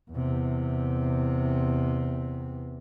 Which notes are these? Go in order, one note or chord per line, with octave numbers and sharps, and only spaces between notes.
E2 C3